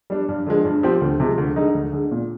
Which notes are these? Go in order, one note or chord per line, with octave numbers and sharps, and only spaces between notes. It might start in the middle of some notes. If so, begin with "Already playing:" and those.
G3 D4
G2
D3 F3 G#3
G2
F3 C4 G4
D2
C3 F3 G#3
D2
D3 G#3 D#4
D2
D3 G#3
A#2